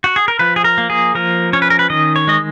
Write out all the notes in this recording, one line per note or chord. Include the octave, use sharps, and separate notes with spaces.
F#4
G#4
A#4
F3 B4
G#4
A#4
A#3
G#4
F3 A#4
C#4 C#5
B4
A#4
B4
D#3 D#5
C#5
G#3 D#5